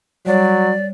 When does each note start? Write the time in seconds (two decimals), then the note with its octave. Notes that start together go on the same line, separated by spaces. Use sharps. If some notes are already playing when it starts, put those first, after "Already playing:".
0.26 F#3 G3 C#5 D5